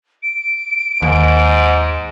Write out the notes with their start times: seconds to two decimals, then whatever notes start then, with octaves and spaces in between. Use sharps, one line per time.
0.23 D7
1.02 D#2 G#2